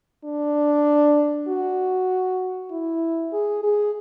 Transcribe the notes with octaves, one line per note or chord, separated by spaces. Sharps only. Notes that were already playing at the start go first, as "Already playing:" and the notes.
D4
F#4
E4
G#4
G#4